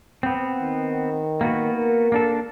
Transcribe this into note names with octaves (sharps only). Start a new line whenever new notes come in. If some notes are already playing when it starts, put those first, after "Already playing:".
B3 C4
D#3
A#3 B3 F#4
A#4
A#3 D4 A4